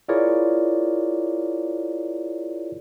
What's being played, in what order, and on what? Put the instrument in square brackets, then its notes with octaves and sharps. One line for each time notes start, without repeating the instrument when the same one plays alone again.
[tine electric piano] E4 F4 G#4 A#4 C#5 D5